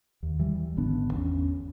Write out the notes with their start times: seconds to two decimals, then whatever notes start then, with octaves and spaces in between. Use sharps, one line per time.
0.23 D#2
0.39 E3 G3
0.77 G#1 D3 B3 D4
1.14 E2 C#4